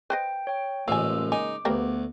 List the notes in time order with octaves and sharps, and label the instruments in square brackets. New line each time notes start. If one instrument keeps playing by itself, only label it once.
[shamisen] B4 C5 D#5 [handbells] G5
[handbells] C#5 G5
[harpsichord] A1 F3 [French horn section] C#3 G#3 A#3 [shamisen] F5 G#5 [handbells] E6
[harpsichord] D#4 [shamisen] G#5 [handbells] D6
[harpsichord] D2 [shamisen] G3 A#3 A#4 [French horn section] B3